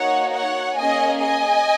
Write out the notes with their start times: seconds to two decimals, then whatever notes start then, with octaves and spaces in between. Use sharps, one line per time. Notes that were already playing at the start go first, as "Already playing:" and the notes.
Already playing: A#3 D#4 F#4 C#5 F#5
0.34 C#5 F#5
0.77 A#3 C#4 G#4 D#5 G#5
1.20 D#5 G#5